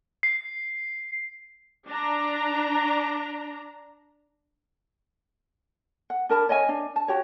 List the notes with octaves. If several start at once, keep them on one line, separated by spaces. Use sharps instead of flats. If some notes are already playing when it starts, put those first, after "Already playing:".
C7
D4 A#5
F#5
D4 A#4 A5 B5
C#5 D#5 E5 G#5
D4
A5
F#4 G4 C#5